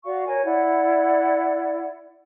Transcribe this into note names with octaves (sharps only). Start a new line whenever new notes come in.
F#4 D5 F5 C#6
A#4 C#5 G#5
E4 D5 F#5